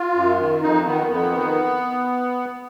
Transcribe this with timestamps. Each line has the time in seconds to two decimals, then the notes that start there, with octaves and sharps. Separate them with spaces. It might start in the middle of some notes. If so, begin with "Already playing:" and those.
Already playing: F4
0.14 F#2
0.38 D#3
0.62 F2 D#4
0.85 D#3 B3
1.10 F2 B3
1.34 D#3